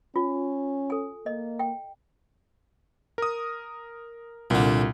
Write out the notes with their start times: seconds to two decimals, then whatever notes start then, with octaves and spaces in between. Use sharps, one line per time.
0.16 C#4 F4
0.90 A4 G#5
1.26 A#3 D#5
1.59 G5
3.18 A#4 D#6
4.50 C2 A#2 D3